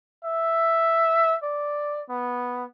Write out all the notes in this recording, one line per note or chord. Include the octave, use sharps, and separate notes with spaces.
E5
D5
B3